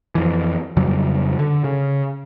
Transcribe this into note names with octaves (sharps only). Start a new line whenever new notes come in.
F2 E3
F2 C#3 F#3 G3
D3
C#3